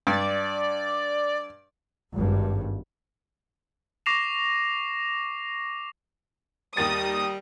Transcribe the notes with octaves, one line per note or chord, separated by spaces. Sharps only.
G2 D5
G#1 G2
C#6 D6 A#6 C7 E7 F7
D#2 G3 A#4 D#6 A6